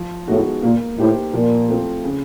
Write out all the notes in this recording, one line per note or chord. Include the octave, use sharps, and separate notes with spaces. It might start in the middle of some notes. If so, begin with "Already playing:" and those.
Already playing: F3
A2 G#3 B3 D#4 F#4
A#2 A#3
A2 D#4 G4 C5
A#2 F3
A3 C4 F4
C#3